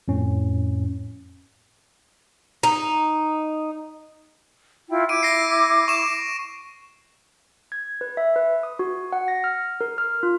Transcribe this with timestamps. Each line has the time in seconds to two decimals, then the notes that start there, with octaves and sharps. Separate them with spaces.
0.08 F2 A2 C#4
2.63 D#4
4.90 E4 F4 G5
5.09 E4 D6 D7 D#7
5.23 A#6 C7
5.88 C#6 E7
7.72 G#6
8.01 B4
8.17 E5
8.36 B4
8.63 D#6
8.79 F#4
9.13 F#5
9.28 A#6
9.44 F6
9.81 A#4
9.98 F6
10.23 F4